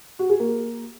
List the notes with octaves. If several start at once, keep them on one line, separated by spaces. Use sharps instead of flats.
F#4
G#4
A#3